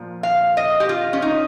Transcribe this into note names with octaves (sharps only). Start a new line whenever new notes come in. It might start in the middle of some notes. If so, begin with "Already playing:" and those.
Already playing: A#2 F3
F5
D#5
G4
F4
C#4
D#4